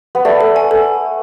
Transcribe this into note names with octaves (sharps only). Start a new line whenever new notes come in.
B3
A3 D5
A4
G#5
A4